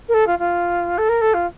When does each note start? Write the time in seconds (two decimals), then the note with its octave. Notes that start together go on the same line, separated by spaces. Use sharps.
0.09 A#4
0.14 A4
0.27 F4
0.39 F4
0.98 A4
1.09 A#4
1.21 A4
1.34 F4